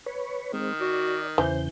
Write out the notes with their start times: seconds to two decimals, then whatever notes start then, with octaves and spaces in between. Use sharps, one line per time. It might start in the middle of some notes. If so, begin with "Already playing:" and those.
0.06 B4 C#5
0.53 D#3 G#3 C4
0.81 F#4 D5
1.38 E2 C#3 E3 C5 G6